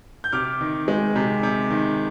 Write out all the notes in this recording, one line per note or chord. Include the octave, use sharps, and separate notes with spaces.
G6
C3 D6 F6
D#3
G#3
C3
C3
D#3